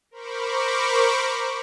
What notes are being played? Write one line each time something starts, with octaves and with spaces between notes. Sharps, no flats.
A#4 C5 B5 C#6 D6